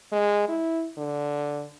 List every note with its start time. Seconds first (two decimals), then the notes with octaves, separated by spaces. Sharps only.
0.12 G#3
0.49 E4
0.98 D3